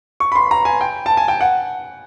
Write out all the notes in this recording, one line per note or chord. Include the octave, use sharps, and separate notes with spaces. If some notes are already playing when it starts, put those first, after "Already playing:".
C#6
B5
C6
A#5
G#5
G5
A5
G#5
G5
F#5